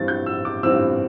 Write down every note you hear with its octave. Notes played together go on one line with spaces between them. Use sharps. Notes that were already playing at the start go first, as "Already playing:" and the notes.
Already playing: G2 E3 C4 A6
G6
E6
D6
G2 E3 C4 E6